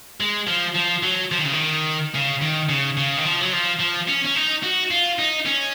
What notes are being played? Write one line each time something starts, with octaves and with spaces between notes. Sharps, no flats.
G#3
F3
F3
F#3
F3
D#3
C#3
D#3
C#3
D#3
C#3
C#3
D#3
F3
F#3
F3
F3
C#4
C#4
D#4
F#4
F4
D#4
C#4